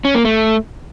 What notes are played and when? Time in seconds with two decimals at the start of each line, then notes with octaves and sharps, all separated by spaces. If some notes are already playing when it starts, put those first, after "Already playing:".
0.05 C#4
0.15 A#3
0.25 A3